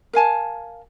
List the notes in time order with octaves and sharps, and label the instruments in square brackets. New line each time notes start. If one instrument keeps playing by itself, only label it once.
[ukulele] A#4 F5 G#5 A5